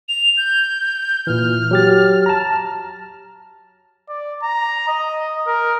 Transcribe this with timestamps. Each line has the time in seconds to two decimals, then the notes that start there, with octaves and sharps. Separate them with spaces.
0.09 F7
0.37 G6
1.27 A#2 E3 F6
1.71 F#3 G4 A6
2.26 A5 A#5
4.09 D5
4.43 A#5
4.88 D#5
5.47 A#4